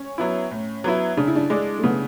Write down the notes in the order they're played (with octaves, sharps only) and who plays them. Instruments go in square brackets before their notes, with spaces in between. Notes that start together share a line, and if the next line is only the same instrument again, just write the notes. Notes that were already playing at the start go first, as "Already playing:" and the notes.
Already playing: [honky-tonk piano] C#4
[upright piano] F#3 B3 E4
A2
F#3 B3 E4
[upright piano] C#3 [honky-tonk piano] D4
[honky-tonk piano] E4
D4
[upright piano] G#3 D4
[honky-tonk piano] A3
[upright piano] C#3 [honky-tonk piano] B3